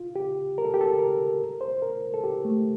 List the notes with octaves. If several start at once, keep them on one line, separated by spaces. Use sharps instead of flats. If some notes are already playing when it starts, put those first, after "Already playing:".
Already playing: F4
G4
A#4
A4
G4
A4
A#4
C5
A#4
A4
G4
A3